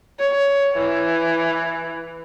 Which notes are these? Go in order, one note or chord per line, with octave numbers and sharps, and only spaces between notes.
C#5
E3